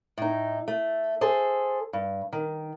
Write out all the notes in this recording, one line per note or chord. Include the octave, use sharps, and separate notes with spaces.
A2 D#4
A3
G#4 A4 C5
G2
D#3